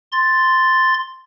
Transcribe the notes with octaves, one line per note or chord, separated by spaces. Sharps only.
C6 A6